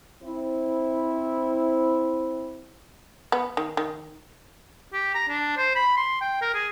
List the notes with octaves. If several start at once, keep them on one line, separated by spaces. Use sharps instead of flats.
C4 E4
B3
D#3
D#3
G4
A#5
D4
C5
B5
C6
G5
A#4
G#4